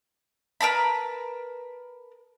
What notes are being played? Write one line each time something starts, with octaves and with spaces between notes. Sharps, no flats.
A#4 B4 A5 B5